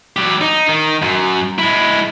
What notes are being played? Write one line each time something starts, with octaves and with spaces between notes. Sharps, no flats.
F#3 G4
D#4
D#3
F#2
G#3 E4